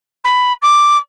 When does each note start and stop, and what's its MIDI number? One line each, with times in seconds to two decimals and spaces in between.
0.24 0.53 83
0.62 0.97 86